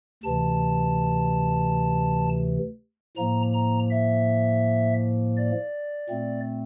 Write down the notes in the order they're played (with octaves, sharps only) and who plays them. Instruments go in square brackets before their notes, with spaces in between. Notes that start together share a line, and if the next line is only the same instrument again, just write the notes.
[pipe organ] D2 C3 E3 A5
A2 F3 A#3 A#5
A#5
E5
D5
A#2 A3 C4